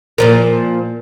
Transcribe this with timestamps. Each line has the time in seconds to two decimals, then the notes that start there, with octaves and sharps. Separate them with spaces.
0.18 A#2 F3 A#4